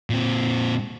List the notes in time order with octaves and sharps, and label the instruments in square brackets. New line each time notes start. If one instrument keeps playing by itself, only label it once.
[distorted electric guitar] A#2 C4